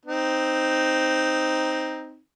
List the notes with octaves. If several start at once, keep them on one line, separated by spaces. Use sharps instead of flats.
C4 D#4